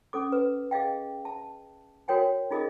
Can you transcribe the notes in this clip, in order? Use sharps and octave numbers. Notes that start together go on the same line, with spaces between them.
C#4 A4 D6
B4
G#4 D#5 F5 G5
A5
F#4 A#4 C#5 G5 G#5
D#4 F4 G#4 A#4 D#5